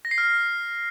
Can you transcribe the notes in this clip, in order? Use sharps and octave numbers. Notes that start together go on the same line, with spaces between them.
A#6
C7
F6